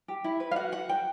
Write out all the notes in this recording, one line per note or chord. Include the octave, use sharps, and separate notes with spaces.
G4
E4
B4
F5
F#4 F#5
F#4 F#5
F#4 G5